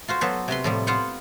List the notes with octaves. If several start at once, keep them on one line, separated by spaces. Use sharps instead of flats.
F4 F#4 C5
F#3 B3 A4 B4 C5
C3 F#4 B4 C6
A2 F3 G3
B3 F4 C5 F#5